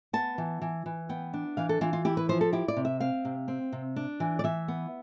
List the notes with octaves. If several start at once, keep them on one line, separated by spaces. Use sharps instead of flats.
B3 A5
E3
E3
E3
B3 G5
D4
E3 F5
A4
E3 F4
F4
E4 G4
B4
F3 C5
A4
E4 G4
D5
C3
E5
C4 F5
C3
C4
C3
D4
E3
D5
E3 E5
B3